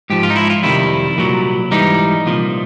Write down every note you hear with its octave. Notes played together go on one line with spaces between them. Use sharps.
G#2 F3 G4
F4
D#4
E4
F4
F2 C3 D#3 G3 E4
C2 A#2 F#3
G#2 E3 G3 D#4
C2 A#2 F3